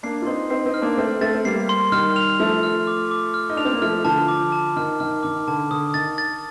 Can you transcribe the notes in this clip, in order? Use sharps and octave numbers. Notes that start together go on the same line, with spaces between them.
A#3 D4 C7
F4
C4 D#4 C6
C4 D#4 C7
C4 D#4
F6
A#3 D4
A3 C4 C7
A3 C4 A6
C4
G3 A#3 C7
C6
D#3 G3 F6
F7
F3 A3 F7
F6
D6
D6
F6
D#4
D4 F7
C4
A#3
F3 A3 F6
D3 F3 A5
D6
A5
D#3 F6
D#3 F6
D#3 D6
D3 A5
D3 D#6
D#3 A6
A6